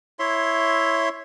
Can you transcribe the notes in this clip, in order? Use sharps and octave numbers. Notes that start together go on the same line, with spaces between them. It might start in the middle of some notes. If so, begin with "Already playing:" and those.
E4 C#5 E5 C6